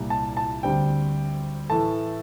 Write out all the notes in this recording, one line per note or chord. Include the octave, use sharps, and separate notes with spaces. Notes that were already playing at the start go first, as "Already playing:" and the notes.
Already playing: C2 A#2 G3
A5
A5
D2 D3 G3 C4 G5
A2 E3 A3 A5